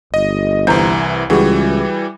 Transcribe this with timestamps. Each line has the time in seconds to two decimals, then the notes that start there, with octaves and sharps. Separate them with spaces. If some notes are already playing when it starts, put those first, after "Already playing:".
0.14 G1 D#5
0.67 C2 E3 C5 A#5
1.30 C#2 E3 G3 F#4 G#4